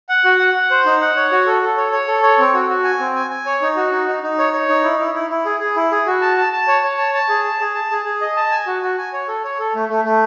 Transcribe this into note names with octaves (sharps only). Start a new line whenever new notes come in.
F#5
F#4
F#5
F#5
C5
D#4
F#5
C#5
F#4
A4
A4
C#5
C#5
A4
C#5
C4
F#4
F#4
G#5
C4
G#5
G#5
C#5
D#4
F#4
D#4
D#4
D#4
C#5
C#5
D#4
E4
E4
E4
E4
G#4
G#4
E4
G#4
F#4
A5
A5
A5
C#5
C#5
A5
A5
G#4
A5
G#4
A5
G#4
G#4
D#5
A5
G#5
F#4
F#4
G#5
C#5
A4
C#5
A4
A3
A3
A3